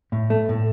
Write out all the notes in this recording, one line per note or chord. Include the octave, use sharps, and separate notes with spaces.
A2
A3
A2